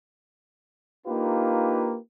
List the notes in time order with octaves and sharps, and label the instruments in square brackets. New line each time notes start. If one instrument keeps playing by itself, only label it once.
[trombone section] A#3 D4 D#4 F4 G4 B4